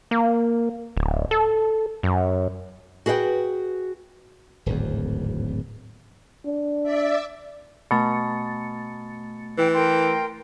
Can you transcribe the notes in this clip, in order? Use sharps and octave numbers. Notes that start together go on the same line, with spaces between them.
A#3
D1
A4
F#2
F#4 G#4 B4 D#5 G5
D1 G#1 E2
D4
D5 E5
B2 A3 A6 C#7
E3 G5
A#4 G5 C6